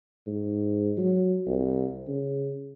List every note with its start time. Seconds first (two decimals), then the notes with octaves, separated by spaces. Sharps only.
0.27 G#2
0.98 F#3
1.47 C2
2.08 C#3